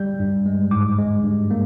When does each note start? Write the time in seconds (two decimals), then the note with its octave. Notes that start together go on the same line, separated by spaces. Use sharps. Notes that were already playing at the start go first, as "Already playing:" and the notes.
Already playing: G3 G6
0.20 G2
0.46 G#3
0.71 G#2 D6
0.98 G#3
1.23 G2
1.51 A#3